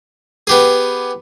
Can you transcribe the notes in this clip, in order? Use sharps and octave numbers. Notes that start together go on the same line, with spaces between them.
B3 G4 G#4